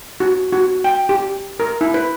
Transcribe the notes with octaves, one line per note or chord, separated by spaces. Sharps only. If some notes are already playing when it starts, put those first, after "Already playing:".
F#4
F#4
G5
G4
A#4
E4
B4